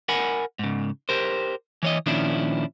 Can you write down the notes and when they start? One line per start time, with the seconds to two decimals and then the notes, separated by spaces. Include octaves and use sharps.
0.09 A#4 F#5 G#5 B5
0.59 G#2 C#3
1.09 G4 A#4 C5
1.83 E3 C#5 D#5
2.06 A#2 D#3 F3 C#4 D4 E4